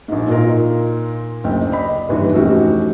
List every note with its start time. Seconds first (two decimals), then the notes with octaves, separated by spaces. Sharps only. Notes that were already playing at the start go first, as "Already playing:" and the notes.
0.08 A#1 G#2
0.29 A#2 D#4 F4 A#4
1.44 F#1 D2 G5
1.72 D5 D#5 B5
2.09 G1 D#2 E3 B4
2.34 F1 G#2 E3 C#4 F#4 G4